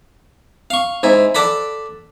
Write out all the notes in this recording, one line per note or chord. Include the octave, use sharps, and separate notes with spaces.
F5 C#6
G#2 E4
A4 D5 F#5 B5